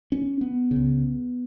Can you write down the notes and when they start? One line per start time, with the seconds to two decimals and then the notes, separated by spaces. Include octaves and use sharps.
0.12 C#4
0.41 B3
0.71 C#3
0.76 C#2